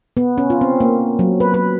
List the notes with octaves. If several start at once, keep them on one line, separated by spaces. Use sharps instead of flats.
B3
C#4
F4
C4
A#3
F#3
B4
B4